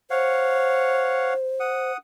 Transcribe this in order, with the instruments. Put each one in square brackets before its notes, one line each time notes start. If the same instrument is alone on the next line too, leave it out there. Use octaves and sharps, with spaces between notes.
[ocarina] C5 [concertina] C#5 F5 F#5
[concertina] F#5 D#6